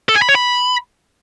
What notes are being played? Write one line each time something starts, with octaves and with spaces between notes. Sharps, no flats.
A4
G#5
B5
C#5
B5